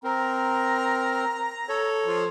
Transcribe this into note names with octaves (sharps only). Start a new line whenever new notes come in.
C4 A#4 A#5
A4 C#5
F3 C5